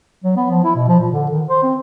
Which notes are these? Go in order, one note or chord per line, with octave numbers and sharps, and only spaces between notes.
F#3
B3
F3
E4
B2
F3
A#2
D3
D#3
C5
C4